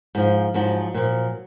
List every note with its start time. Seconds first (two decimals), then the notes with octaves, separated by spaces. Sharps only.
0.15 G#2 F3
0.54 G#2 F3 F#3
0.94 A#2 F3